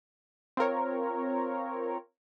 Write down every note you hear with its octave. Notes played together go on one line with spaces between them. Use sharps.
C4 F4 A#4 C#5